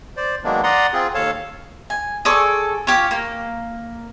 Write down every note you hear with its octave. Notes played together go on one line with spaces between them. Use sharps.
C5 D5
D#3 F#3 G#3 A#3 B3 D4
D5 F#5 A#5 C6 D#6
C4 F4 G#4
D#2 A4 C#5 F5 A5
G#5
G#4 A4 D5 C#6
F4 G4 C#5
A#3